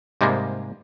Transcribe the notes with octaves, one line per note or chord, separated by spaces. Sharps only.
G#2 C3 G3 G#3 A#3